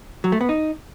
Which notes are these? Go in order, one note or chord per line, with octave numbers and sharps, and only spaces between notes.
F#3
A3
B3
D#4